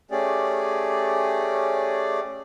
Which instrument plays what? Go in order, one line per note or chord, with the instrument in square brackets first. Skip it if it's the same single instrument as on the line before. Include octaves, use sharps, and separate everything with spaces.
[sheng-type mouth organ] A3 C#4 G4 G#4 D5